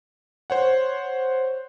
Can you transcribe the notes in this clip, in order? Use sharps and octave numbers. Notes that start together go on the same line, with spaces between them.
C5 C#5 F#5